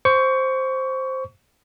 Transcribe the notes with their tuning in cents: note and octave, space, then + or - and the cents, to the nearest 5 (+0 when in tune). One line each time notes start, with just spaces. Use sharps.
C5 +0 C#6 +20